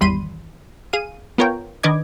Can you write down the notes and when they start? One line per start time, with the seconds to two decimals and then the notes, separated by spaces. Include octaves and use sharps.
0.01 G#1 E2 G3 B5 C6 D#7
0.93 G#4 F5 D#7
1.38 B3 F4 A#4 C#5 G5
1.83 D#3 D4 B4 D#5 D6 G#6